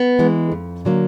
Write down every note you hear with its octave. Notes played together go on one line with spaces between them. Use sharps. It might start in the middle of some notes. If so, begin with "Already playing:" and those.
Already playing: B3
E3 G#3
F2
D3 F#3 A#3